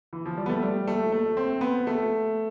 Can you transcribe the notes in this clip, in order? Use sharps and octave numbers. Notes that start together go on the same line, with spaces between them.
E3
F3
G3
B3
A3
G3
A3
A3
C4
B3
A3